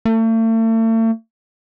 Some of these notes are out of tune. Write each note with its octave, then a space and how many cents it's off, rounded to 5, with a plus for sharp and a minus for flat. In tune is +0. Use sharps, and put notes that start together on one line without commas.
A3 +40